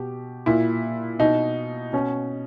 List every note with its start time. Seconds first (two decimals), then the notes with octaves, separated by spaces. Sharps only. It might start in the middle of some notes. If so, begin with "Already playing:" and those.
Already playing: B2 G4
0.46 A#2 E4
1.19 B2 D#4
1.93 B2 C#4